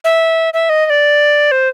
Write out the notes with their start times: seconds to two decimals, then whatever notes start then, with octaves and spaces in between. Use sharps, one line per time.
0.04 E5
0.54 E5
0.69 D#5
0.86 D#5
0.90 D5
1.51 C5